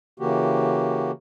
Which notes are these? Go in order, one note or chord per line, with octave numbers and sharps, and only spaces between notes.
C#3 E3 A#3 F#4 G4